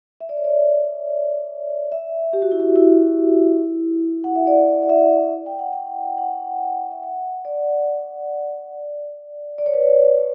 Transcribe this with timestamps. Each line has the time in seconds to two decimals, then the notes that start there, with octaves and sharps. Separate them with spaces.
0.21 E5
0.29 D5
0.37 C#5
0.44 D5
1.92 E5
2.33 G4
2.42 F#4
2.51 E4
2.60 F#4
2.76 E4
4.24 F#5
4.36 E5
4.47 D5
4.83 D5
4.89 E5
5.46 G5
5.59 F#5
5.73 G5
6.18 F#5
6.91 E5
7.03 F#5
7.45 D5
9.58 D5
9.66 C#5
9.74 B4
9.82 C#5